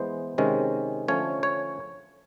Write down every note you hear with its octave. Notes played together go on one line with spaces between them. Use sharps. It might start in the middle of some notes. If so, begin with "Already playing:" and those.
Already playing: E3 G#3 B3 C5
C3 D#3 G#3 C#4
D3 F3 A3 C#4 C#5
C#5